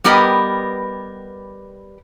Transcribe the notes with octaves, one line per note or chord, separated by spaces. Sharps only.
G3 B3 G4 A#4 B4 D#5